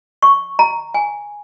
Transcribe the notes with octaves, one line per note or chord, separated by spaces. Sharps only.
C#6
A#5
G#5